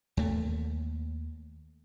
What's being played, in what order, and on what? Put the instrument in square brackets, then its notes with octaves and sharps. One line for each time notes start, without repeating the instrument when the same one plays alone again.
[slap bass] D#2 A3